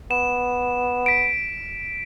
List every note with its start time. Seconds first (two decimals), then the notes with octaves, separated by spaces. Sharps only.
0.11 B3 E7
1.06 B6 D7